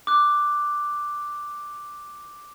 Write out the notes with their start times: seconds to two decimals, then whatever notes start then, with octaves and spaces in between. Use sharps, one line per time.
0.07 D6 F#6